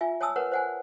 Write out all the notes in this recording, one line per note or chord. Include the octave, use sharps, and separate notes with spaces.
F4 E5 G#5
C#5 G#5 A5 D#6 E6
A#4 B4 C#5 F#5
C5 F#5 G#5